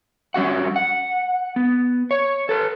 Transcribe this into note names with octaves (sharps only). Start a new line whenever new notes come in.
G3 C#4 F#4 F#5
F#5
B3
C#5
A4 B4